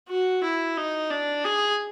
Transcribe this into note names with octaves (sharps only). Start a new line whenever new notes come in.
F#4
E4
D#4
D4
G#4